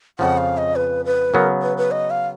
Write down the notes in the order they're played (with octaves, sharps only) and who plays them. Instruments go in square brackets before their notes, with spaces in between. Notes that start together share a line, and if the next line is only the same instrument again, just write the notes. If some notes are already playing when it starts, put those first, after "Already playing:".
[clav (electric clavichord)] F2 C#3 F3 [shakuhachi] F#5
[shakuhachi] F5
D#5
B4
B4
[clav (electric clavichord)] C#3 F#3 B3 [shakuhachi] A#4
[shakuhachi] B4
B4
D#5
F5